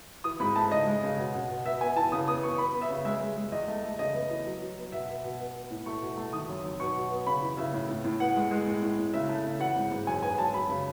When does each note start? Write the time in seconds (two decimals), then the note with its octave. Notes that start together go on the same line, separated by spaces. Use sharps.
0.24 E3 D#6
0.40 G#2 B5
0.56 A3 A5
0.72 C#3 D#5
0.87 G#3
1.03 C#3
1.18 B2
1.34 B2
1.49 B2
1.65 B3 E5
1.81 B3 G#5
1.96 E3 A5
2.12 C#3 D#6
2.28 B3 D#6
2.43 B3 C#6
2.58 B3 B5
2.74 B3
2.82 E5
2.90 C#3
3.05 G#3 E5
3.21 G#3
3.36 G#3
3.52 E2 D#5
3.68 A3
3.84 A3
3.99 C#3 D#5
4.14 B3
4.30 E3
4.46 F#3
4.62 F#3
4.77 B3
4.92 B2 E5
5.09 B3
5.24 B2
5.39 B3
5.55 B3
5.71 A2
5.86 A3 C#6
6.02 B2
6.17 A3
6.33 D#3 D#6
6.49 F#2
6.64 F#2
6.80 B2 C#6
6.95 B2
7.11 B3
7.27 C#3 B5
7.42 E3
7.57 C#3 E5
7.73 A2
7.89 A2
8.04 A2
8.20 B3 F#5
8.36 G#3
8.51 G#3
8.67 A2
8.82 A2
8.98 A2
9.14 C#3 E5
9.29 A3
9.45 C#3
9.60 E3 F#5
9.76 G#2
9.91 G#2
10.07 F#2 G#5
10.23 B3 G#5
10.38 F#2 A5
10.54 F#2 B5
10.69 C#3